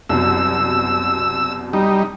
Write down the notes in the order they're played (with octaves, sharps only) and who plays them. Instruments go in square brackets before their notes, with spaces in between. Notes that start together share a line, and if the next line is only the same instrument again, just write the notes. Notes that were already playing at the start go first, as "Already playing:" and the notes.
[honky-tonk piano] C2 F#2 B2 [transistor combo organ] E6
[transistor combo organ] G3 D#4